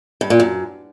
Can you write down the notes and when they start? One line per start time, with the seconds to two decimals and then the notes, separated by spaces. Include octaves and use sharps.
0.21 G2
0.30 A#2
0.40 F#2